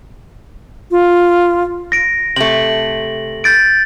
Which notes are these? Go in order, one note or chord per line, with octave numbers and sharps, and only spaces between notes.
F4
A#6 D7
C3 A3 F#7
G6 A6 D7